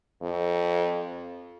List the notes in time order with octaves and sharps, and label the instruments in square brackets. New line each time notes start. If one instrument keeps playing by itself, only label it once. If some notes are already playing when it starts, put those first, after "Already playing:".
[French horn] F2